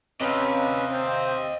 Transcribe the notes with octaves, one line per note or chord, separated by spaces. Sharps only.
C3 C#4 B4 D#5 F5
C4 G6